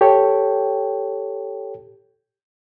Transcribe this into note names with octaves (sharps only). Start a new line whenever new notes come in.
G4 A4 C#5 G5